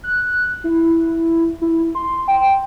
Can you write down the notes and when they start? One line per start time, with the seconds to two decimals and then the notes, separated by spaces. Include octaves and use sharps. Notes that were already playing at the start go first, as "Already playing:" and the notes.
0.04 F#6
0.64 E4
1.61 E4
1.95 C6
2.28 G5